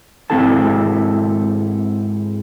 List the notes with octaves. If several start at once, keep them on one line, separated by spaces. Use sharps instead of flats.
G#2 C#3 C4 E4 A4 A5